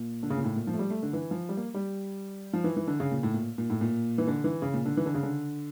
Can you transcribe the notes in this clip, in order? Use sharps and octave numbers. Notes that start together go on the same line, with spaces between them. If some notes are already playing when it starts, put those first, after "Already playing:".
Already playing: A#2
D3
C#3
A#2
A2
A#2
F3
A3
G3
A3
D3
E3
F3
G3
A#3
G3
F3
E3
E3
D3
C#3
A#2
A2
A#2
A#2
A2
A#2
E3
D3
E3
C#3
A#2
D3
E3
D3
C#3
D3